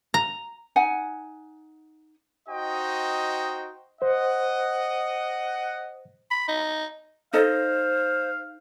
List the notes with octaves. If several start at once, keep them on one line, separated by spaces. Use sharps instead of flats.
A#5
D#4 F#5 G#5
D#4 F#4 C5 D#5 G5
C5 D#5 F#5
B5
D#4
D#4 A4 C5 D#5 F5